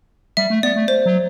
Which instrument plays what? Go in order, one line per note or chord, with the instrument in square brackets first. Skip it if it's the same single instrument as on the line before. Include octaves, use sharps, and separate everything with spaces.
[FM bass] G3 [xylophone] E5
[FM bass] A3
[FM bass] B3 [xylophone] D5
[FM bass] A3
[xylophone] C5
[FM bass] F#3